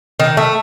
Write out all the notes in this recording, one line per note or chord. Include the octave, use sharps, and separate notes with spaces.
D#3
A3